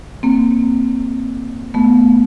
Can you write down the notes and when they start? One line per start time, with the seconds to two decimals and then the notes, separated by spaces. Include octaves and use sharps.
0.23 A#3 C4
1.74 A3 B3